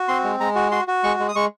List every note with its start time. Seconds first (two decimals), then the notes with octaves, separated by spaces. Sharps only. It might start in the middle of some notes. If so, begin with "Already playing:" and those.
Already playing: F#4
0.08 C4 C6
0.24 G#3
0.40 G#3 A#5
0.56 F#4
0.71 F#4 C6
0.88 F#4
1.04 G#3 C#6
1.20 G#3
1.29 D#6
1.35 G#3 C#6